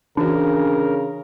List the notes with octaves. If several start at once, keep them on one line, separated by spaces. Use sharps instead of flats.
C#3 E3 D4 F#4 A#4